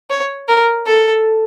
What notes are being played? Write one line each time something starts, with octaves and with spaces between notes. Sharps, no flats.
C#5
A#4
A4